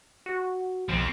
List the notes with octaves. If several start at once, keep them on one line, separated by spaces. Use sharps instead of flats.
F#4
B1 F3 C4